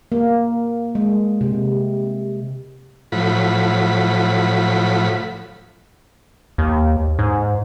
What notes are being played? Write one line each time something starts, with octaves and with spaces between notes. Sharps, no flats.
A#3
G#3
C3
A2 F3 F#3 B5
D#2
G#2